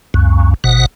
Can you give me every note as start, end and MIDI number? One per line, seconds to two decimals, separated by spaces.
0.14 0.54 37
0.14 0.54 42
0.64 0.86 32
0.64 0.86 47
0.64 0.86 78